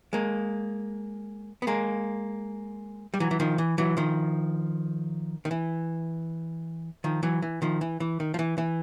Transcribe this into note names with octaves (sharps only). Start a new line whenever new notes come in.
G#3 A#3
B3
G#3 A#3
G3
E3 F#3
E3
D#3 F3
E3
E3 F#3
D#3 F3
D#3
E3
D#3 F3
E3 F#3
E3
D#3 F3
E3
E3
D#3
F3
E3
E3